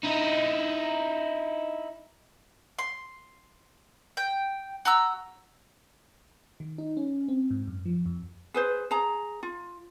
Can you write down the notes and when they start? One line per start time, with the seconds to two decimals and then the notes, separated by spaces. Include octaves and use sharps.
0.04 D#4 E4
2.78 C6
4.17 G5
4.85 F#4 A#5 E6
6.60 D#3
6.78 D#4
6.97 C#4
7.28 C4
7.51 G#2
7.67 F#2
7.85 F3
8.06 F2
8.54 G#4 B4 C5
8.91 G#4 A#5
9.43 F4